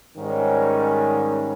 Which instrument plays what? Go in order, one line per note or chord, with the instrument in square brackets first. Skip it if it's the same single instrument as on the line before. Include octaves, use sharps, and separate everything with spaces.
[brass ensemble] G#2 D#3 G3 C#4